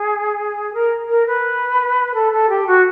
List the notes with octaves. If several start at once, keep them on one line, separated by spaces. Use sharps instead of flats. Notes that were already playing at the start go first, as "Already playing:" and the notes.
Already playing: G#4
A#4
A#4
B4
A4
A4
G4
F#4